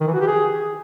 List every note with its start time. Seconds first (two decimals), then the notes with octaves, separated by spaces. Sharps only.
0.01 D#3
0.07 E3
0.14 F#4
0.21 G4
0.27 G#4